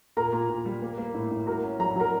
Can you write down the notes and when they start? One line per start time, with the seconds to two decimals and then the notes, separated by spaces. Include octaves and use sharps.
0.17 A#2 A#4 A#5
0.33 A#2
0.49 A#2
0.66 G3
0.82 A#3
0.98 A#3
1.14 A2
1.31 A2
1.46 F#4 A#4 A#5
1.63 C#4
1.79 F#3 A#5
1.96 F#3 A#4 A#5